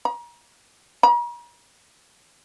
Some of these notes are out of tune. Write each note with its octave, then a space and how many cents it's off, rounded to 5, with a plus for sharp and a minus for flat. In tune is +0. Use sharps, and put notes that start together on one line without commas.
A#5 +35
A#5 +45